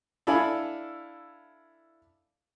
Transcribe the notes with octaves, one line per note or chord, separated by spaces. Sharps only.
D4 E4 A4 F5 G#5 B5